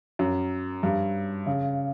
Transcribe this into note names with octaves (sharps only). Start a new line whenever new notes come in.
F#2
G2
C#3